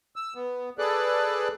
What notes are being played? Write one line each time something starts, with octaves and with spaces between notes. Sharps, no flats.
E6
B3
G#4 A4 B4 D5 F#6